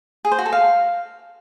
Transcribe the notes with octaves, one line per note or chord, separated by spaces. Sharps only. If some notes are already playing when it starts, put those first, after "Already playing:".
G#4
C5
F#4
A4
F5